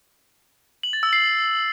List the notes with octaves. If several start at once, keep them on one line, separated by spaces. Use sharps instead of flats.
F#7
A6
E6
C7